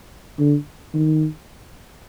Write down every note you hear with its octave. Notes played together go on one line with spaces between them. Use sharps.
D3
D#3